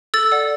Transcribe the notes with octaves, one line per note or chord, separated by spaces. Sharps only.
A4 E6 A6
D5 F#5